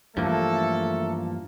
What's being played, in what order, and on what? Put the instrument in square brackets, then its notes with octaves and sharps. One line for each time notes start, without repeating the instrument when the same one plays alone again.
[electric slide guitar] G2 A#3 [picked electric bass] E3 F3 [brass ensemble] A3 A4